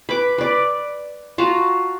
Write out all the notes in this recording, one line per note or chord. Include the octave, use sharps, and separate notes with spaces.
B4 D6
B4 D5
F4 F#4 A5 A#5